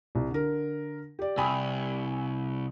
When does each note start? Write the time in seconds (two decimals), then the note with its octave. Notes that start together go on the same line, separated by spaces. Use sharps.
0.15 C2
0.31 D3 A#4
1.19 G4 D5
1.38 C2 G5 G#5 B5